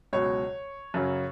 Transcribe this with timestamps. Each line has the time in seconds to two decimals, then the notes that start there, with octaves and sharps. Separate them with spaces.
0.13 C#2 B2 F#3 C#5
0.94 F#2 C#3 F#3